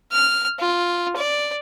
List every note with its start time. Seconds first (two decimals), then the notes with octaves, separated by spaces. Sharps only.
0.12 F6
0.59 F4
1.17 D5